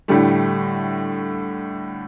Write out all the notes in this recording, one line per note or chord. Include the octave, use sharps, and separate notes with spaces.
A2 D3 G3 A3